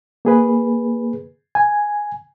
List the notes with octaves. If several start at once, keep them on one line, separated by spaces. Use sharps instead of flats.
A#3 G#4 B4
G#5